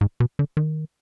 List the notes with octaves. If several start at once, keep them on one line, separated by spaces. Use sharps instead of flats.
G#2
B2
D3
D#3